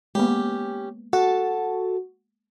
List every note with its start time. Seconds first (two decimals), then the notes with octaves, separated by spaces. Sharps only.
0.15 G#3 A#3 B3 C#4 G4
1.13 F#4 A4 A5